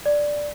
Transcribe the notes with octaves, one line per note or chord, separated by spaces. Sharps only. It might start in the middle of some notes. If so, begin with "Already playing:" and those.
D5